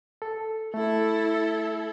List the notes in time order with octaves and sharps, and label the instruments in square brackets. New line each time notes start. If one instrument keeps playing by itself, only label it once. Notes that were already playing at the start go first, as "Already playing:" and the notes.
[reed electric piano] A4
[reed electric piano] A3 [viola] E4 A4